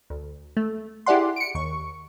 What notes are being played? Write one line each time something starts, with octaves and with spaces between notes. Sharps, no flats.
D2
A3
E4 G4 G#4 D5 F#5 C6
C#7 D7
D#2 C#6